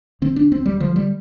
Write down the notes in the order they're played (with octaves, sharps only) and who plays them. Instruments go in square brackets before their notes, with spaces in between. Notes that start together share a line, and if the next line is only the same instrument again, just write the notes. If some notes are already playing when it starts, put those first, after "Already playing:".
[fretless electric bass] D3 C4
D4
D2 C4
G3
D3 F3
G3